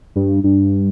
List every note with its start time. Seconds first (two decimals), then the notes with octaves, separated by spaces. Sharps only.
0.15 G2
0.44 G2